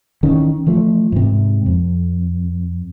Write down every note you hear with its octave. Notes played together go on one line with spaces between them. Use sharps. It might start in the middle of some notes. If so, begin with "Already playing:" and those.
D#3 E3 C#4
E3 F3 A3
G#2 C3
F2